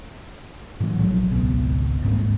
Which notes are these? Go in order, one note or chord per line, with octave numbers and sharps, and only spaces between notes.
A2 E3 F#3
A#1 F3 F#3
G#1 C#2 B2
D#1 G#1 G#2 A#3